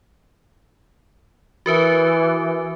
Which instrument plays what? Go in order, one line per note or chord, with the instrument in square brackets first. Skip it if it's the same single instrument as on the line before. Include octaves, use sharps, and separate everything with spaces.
[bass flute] E3 [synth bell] F#4 A#4 B4